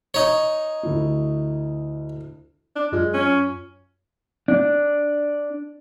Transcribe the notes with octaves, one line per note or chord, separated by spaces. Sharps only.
D#4 C#5
D2 E4
D4
F#2 G#3 F4
C#4
D4